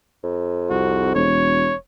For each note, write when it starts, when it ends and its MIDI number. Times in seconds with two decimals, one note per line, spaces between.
0.23 1.29 41
0.70 1.13 36
0.70 1.14 66
1.15 1.73 28
1.15 1.76 73